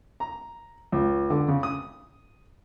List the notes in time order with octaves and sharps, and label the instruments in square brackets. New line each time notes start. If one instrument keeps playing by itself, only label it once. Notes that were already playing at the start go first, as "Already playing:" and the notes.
[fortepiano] A#5
C#2
D3
C#3
D#6